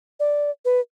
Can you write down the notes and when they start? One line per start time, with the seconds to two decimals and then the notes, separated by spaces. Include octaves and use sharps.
0.20 D5
0.65 B4